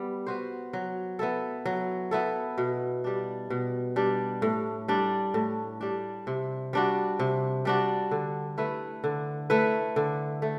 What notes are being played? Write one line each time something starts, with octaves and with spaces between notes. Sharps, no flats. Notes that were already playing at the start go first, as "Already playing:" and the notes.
Already playing: G3 B3
B3 F#4 C5
F#3
B3 E4 A4
F#3
B3 E4 A4
B2
G3 D4
B2
G3 D4
A2
G3 D4
A2
G3 D4
C3
G3 D4 F#4
C3
G3 D4 F#4
D3
A3 E4 B4
D3
A3 E4 B4
D3
A3